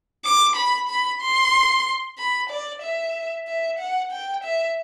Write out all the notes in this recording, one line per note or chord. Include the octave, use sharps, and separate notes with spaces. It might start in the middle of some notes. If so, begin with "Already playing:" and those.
D6
B5
B5
C6
B5
D5
E5
E5
F#5
G5
E5